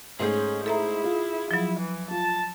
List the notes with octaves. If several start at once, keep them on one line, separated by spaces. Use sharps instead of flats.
G#2 A3 C#4 G#4 G6
E4 A4 E5 A#5
F4
F3 F#3 E4
E3
F4 A5